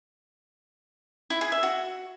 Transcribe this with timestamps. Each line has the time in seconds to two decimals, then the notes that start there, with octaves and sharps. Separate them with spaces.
1.30 E4
1.41 G#4
1.52 E5
1.63 F#4